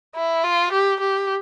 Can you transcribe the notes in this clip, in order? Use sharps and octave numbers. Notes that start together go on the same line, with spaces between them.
E4
F4
G4
G4